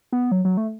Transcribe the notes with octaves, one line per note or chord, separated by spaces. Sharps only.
B3
F#3
F#3
A3